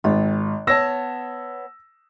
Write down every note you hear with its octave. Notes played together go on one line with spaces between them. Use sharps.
G#1 F4
B3 C#5 A5 E6 A#6